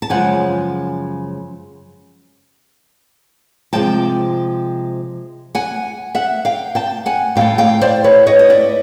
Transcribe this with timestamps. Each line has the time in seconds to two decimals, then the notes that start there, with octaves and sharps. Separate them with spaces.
0.02 A5
0.10 F#2 C#3 F3 G#3 F#5 G#5
3.73 C3 F3 G#3 G5 A5
5.55 F#5 G#5
6.15 E5 F#5
6.45 F5 G5
6.75 G5 A5
7.06 F#5 G#5
7.36 A2 E3 F5 G5
7.41 A3
7.58 F5 G5
7.81 C5 D5
8.04 B4 C#5
8.27 C#5 D#5
8.39 D#5
8.50 D5 E5